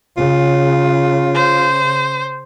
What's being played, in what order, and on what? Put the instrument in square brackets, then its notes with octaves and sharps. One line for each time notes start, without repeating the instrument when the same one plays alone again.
[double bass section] C#3 [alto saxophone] F4
[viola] C5